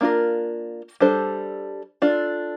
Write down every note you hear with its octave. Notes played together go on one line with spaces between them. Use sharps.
A#3 D4 F4 A#4
G3 D4 A4 C5
D4 F4 A4